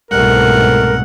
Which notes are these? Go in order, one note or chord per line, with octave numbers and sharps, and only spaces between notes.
C2 G#2 B2 A3 A#4 F#5